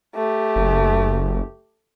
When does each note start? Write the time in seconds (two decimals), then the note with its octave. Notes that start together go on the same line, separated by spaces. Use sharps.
0.15 A3 G4
0.56 F#1